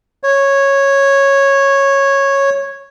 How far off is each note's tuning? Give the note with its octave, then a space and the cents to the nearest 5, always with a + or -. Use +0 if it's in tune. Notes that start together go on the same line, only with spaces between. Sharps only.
C#5 -10